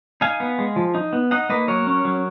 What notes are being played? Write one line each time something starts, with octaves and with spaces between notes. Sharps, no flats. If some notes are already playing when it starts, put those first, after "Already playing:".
D#4 F5 G#5
B3
G#3
F3
D#4
B3
D#4 D#5 F#5
A#3 B4 D#5
F#3 A#4 C#5
C#4
F#3